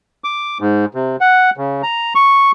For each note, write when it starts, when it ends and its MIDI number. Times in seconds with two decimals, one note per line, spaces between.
0.24 0.58 86
0.60 0.85 44
0.94 1.16 48
1.21 1.50 78
1.57 1.82 49
1.83 2.14 82
2.15 2.52 85